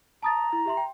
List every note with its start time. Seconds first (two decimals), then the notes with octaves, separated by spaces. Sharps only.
0.23 A5 A#5 D#6 A6
0.53 E4
0.66 G4 E5 C6
0.77 G5